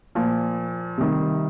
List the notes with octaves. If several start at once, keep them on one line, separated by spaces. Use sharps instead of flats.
A#2 F3
C3 D#3 G3